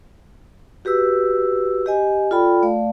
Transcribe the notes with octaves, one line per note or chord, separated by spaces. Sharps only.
F#4 G4 B4 E6
G4 D#5 G#5
F4 A4 D5 G5 B5
A3 D5 F5